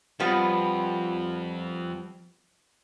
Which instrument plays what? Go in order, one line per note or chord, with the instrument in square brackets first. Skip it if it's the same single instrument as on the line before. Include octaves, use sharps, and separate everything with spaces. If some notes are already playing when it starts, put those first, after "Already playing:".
[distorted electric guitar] F2 [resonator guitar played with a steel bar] F3 G3 B3